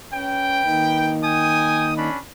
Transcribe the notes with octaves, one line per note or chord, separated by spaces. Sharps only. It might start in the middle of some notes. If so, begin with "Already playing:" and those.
C#4 B4 G5
D#3 A#3 D#4
G5 G#5 D#6
C#4 D4 B5